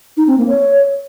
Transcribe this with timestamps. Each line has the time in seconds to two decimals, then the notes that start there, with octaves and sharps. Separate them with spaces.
0.17 D#4
0.27 C4
0.38 A#3
0.48 C#5